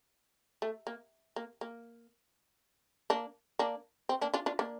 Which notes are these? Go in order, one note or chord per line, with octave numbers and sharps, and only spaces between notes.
A3
A#3
A#3
A#3
A#3 D4
A#3 D4
C4
A#3 D4
D4 F4
D4 F4
A#3 D4